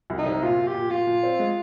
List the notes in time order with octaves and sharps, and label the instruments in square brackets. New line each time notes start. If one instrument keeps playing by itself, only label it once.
[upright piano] C2
[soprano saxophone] D#4
[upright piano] C3
[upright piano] A#2 [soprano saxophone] F4
[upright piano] A#2
[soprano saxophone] G4
[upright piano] A#2
[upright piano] A#2 [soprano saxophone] F4
[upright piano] A#2
C4
G#3